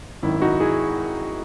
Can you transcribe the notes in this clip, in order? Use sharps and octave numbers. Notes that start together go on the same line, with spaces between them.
G#1 F#2 D#3 E4
D#4 F#4
E4 G#4